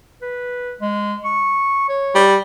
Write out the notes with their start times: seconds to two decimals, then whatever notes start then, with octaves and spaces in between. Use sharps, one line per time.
0.22 B4
0.81 G#3
1.24 C#6
1.89 C#5
2.15 G3